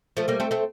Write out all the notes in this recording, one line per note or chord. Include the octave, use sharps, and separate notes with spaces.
F3 A3
G3 A#3
A3 C4
A3 C4